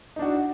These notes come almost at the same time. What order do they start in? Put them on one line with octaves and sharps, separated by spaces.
D#4 D4 F#4